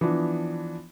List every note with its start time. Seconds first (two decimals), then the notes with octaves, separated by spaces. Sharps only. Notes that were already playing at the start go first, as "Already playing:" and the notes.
0.01 E3 F3 B3 D4